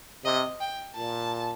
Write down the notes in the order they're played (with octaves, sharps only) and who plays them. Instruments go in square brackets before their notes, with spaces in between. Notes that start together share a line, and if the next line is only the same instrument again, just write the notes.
[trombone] C3 [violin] D#5
[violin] G5
[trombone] A#2 [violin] A5